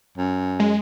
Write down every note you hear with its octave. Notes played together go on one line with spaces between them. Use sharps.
F#2
G#3